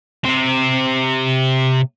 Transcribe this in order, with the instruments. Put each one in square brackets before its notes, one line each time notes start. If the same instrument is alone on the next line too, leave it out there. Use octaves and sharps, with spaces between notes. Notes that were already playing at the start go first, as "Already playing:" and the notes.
[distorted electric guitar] C3 C4